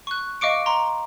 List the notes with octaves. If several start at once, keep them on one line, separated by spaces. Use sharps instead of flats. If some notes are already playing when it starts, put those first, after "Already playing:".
C#6 F#6
D#5 F5 C#6 D6 C#7 D7
A#5 C6